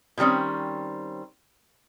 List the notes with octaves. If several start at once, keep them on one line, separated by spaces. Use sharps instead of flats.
B2 D#3 G3 C4 C#4